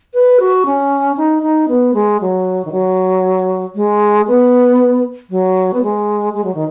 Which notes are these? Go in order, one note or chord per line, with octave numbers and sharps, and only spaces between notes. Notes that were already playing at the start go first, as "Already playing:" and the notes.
B4
F#4
C#4
D#4
D#4
B3
G#3
F#3
D#3
F#3
G#3
B3
F#3
B3
G#3
G#3
F#3
D#3